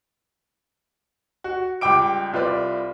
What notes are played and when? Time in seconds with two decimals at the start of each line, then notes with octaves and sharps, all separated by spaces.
1.44 F#4
1.81 C#2 G3 G5 D6 D7
2.33 C2 F4 B4 C5 D5